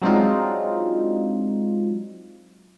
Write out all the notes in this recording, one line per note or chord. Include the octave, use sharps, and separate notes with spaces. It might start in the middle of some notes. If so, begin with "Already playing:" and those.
F#3 G#3 C4 D4 D#4 F4